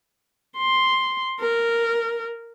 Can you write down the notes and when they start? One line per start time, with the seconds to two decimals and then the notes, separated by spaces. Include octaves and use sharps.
0.57 C6
1.41 A#4